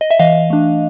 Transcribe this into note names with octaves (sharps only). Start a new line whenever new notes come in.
D#5
E5
E3 D#5 F5
A3 D4